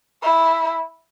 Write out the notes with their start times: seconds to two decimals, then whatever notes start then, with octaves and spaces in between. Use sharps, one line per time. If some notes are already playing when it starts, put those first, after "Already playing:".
0.23 E4